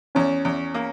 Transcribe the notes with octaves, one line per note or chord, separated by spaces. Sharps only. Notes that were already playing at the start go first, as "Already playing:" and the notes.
E2 C#4
E2
A#3